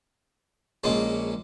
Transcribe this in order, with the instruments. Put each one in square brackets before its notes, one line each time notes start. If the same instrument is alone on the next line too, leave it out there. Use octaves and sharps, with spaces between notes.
[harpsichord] A#1 A#2 G#3 C#4